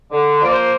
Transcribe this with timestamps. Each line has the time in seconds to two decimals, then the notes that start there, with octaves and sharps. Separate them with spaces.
0.11 D3
0.42 F3 A#3 D5
0.51 C5